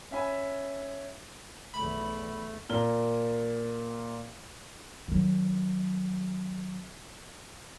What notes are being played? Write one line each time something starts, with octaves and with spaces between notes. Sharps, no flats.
C#4 E5 G#5 B5
B1 E2 A3 B5
A#2 A#4 G7
D#3 F#3